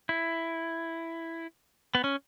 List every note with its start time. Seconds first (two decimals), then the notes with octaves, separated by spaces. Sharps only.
0.09 E4
1.95 B3
2.04 C#4